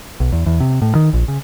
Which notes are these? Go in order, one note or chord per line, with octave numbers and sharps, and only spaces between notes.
B1
E2
E2
C3
A2
D#3
A#1
C#3